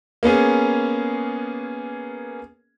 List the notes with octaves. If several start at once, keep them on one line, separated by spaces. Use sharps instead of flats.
A#3 B3 C#4 G#4